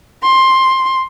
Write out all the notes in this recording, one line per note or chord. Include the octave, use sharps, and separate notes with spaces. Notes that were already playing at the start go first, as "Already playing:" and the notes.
C6